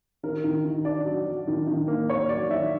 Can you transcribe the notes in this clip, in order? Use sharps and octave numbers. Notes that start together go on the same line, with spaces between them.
D#3 A#4
D#3
D#3
D4 D5
F#3
F#3
D#3
D#3
A#3
A#3 C#5
F#3 D5
D#3 E5